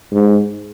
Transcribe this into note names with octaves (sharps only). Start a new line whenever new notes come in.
G#2